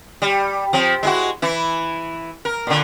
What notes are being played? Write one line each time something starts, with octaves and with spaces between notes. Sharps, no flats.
G3
F3 C4
G#3 E4 F#4
E3 E4
A#4
A#2 D3